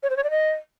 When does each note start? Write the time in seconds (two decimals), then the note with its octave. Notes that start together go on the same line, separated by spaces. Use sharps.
0.03 C#5
0.10 C5
0.17 C#5
0.24 D5
0.31 D#5